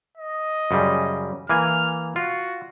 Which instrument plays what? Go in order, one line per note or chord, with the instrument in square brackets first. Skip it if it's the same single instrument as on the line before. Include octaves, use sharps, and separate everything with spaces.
[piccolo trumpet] D#5
[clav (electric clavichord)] F#2 C#3 G3
[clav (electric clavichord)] E3 A#3 G#5 [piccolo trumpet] F6
[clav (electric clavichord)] F4 [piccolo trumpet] F#4